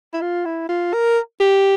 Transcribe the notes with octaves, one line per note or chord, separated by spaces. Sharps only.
E4
F4
E4
F4
A#4
G4